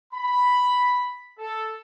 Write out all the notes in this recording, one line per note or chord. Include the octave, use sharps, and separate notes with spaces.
B5
A4